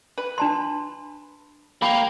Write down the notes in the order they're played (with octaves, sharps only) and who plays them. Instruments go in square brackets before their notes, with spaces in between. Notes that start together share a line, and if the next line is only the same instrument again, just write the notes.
[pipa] B4
[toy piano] D4 A5 C6
[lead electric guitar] A#3 [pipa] G4 [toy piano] B5